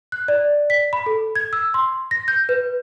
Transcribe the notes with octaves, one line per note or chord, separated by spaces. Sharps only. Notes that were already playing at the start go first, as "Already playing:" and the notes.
F#6
D5
B6
B5
A4
G#6
E6
C6
A#6
G6
B4